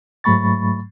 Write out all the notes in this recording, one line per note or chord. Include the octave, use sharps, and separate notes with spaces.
G#2 F#3 A3 B5 C#6 A6